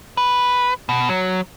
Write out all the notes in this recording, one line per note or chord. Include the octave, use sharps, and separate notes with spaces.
B4
B2
F#3